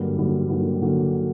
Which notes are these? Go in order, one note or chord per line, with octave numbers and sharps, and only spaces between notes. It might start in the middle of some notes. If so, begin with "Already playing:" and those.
Already playing: G2 D3 F#3 A#3
G2 D3 F#3 A#3
G2 D3 F#3 A#3
D3 F#3 A#3